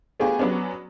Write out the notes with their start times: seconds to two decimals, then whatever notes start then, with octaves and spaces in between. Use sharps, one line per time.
0.20 A3 B3 D4 F4 G4 G#4
0.39 F#3 B3 C#4 D4